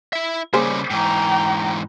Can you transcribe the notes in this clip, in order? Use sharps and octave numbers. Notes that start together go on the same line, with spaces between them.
E4 E5
C#3 G3 A#3 G#4 C5
G#2 E3 G5 A#5